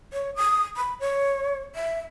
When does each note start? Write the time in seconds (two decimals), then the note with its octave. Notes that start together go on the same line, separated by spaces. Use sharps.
0.13 C#5
0.36 D#6
0.77 B5
1.00 C#5
1.75 E5